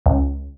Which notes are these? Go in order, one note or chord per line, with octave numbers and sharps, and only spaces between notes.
C#2